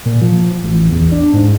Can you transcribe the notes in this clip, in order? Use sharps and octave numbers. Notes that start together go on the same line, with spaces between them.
A#2
F3
A1
E2
D4
G#2